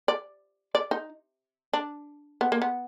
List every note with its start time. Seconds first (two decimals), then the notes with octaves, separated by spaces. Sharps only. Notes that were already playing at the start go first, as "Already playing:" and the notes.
0.08 D5
0.75 D5
0.91 D#4
1.73 D4
2.41 B3
2.52 A#3
2.62 B3